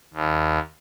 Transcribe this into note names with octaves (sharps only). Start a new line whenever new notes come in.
D#2